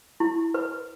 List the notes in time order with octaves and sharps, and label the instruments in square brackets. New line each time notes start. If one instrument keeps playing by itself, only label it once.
[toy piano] E4
B4